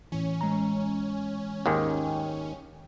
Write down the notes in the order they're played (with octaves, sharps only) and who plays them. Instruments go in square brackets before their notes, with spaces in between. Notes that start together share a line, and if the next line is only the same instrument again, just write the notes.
[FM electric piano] A2 E3 [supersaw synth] C#4
[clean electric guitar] G#3 A#5
[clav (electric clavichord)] D#2 G#2 D#3 [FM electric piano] G5 G#5